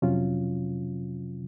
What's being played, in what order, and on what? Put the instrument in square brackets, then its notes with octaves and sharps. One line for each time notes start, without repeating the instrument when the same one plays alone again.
[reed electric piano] F2 C3 F#3 C#4 F4